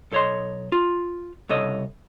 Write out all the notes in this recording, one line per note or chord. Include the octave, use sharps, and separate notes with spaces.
B1 A4 C5 C#5 D#5 C6
F4
C2 C#3 A4 C#5 D#5